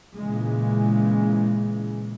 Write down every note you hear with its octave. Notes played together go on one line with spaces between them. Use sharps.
A#2 C#3 E3 G#3